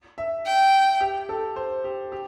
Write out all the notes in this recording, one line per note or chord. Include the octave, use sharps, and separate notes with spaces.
E5
G5
G4
A4
C5
G4
G4